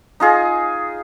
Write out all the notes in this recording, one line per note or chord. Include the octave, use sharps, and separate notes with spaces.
D#4 F4 G#4